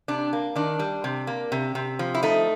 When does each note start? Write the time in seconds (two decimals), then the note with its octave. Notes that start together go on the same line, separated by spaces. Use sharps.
0.08 C3 D4
0.33 A#3
0.56 D#3 D4
0.79 G3
1.04 C3
1.27 A#3
1.52 C3
1.75 C3
1.99 F3
2.15 E4
2.23 A3 D#4